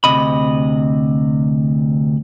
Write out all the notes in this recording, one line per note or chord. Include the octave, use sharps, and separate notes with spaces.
D2 C3 D#5 B5